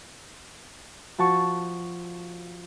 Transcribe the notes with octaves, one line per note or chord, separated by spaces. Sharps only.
F3 F#4 A5 C#6